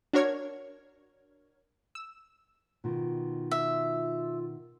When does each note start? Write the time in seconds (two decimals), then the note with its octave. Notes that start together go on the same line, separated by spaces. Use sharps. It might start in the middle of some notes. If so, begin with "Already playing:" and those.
0.13 D4 F#4 A#4 C#5 F6 G#6
1.95 E6
2.84 B2 D#3 F4
3.51 E5